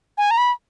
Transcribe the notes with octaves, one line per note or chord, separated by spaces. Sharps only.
G#5
A#5
B5